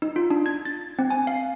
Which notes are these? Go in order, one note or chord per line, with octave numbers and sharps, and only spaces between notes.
D#4
F4
D4
G#6
A6
C4
G#5
F5